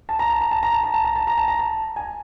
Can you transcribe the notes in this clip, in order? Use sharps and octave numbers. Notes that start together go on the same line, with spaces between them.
A5
A#5
A5
A#5
A5
A#5
A5
A#5
A5
A#5
A5
A#5
A5
A#5
A5
G#5